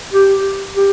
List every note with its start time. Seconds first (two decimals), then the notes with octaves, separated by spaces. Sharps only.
0.13 G4
0.76 G4